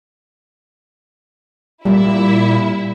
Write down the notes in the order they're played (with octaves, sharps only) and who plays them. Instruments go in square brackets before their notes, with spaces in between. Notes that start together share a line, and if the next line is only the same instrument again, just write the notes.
[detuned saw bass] A#2 [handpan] G3 [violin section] E4 E5